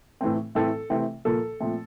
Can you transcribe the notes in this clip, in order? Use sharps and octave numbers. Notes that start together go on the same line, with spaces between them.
A2 E3 A3 C4
A2 E3 A3 C4 A4
C3 E3 A3 C4
A#2 F3 A#3 A4
A#2 F3 A3 C4